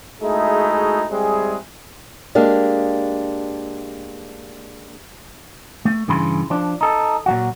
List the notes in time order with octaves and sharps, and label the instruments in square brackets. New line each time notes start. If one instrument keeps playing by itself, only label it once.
[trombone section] G#3 A3 D#4 E4 F#4 G#4
G3 G#3 C4 E4 G#4
[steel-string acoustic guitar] G#3 A#3 D4 G4
[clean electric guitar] A3
G2 C#3 E3 B5 C6
F3 D4
D#4 A4
A#2 F#3 F#4